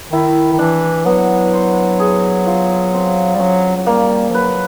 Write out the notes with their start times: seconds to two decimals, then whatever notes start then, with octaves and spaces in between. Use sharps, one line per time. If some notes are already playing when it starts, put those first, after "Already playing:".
0.12 D#3 E4
0.52 D#3
0.59 E3 D4
1.05 F#3 B3
1.53 C5
2.00 G#4
2.47 F4
2.94 C4
3.36 G3
3.40 F#3 C#4
3.77 F#3
3.86 G3 A#3
4.29 F3
4.33 F#3 B4